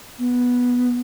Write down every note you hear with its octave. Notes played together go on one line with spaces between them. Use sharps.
B3